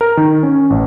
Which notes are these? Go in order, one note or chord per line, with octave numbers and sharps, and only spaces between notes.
A#4
D#3
C#4
A1